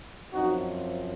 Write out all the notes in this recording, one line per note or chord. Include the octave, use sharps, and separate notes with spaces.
F#2 F3 C4 D#4 F#4